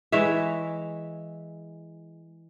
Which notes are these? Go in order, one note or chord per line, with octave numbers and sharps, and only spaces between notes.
E3 G#3 C#5 E5